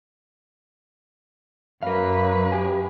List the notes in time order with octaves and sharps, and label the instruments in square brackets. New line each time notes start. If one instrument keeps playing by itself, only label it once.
[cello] F#2 B4 [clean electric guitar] A#4 F5
[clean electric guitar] G4 G#5